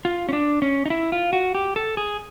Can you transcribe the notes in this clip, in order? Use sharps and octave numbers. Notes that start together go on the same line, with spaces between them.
F4
C#4
D4
C#4
D#4
E4
F4
F#4
G4
A4
G#4